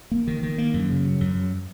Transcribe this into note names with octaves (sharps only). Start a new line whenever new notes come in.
A#3
D#3
D#3
A#3
F#2
C#3
F#3
F#2
F#3